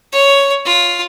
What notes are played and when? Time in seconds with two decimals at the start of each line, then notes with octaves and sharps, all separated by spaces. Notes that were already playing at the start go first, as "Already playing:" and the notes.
0.12 C#5
0.65 F4